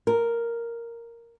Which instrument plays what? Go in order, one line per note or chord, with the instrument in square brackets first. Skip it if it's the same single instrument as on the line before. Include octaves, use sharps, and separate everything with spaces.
[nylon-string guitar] A#4